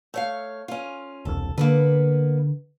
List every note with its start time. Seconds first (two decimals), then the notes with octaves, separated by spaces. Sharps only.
0.14 A3 C#5 F5
0.68 C#4 F4
1.25 E1 C2 A4
1.58 D3 A#3 B3 B4